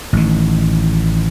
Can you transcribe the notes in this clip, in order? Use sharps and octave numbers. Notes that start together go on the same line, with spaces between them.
A1 D#3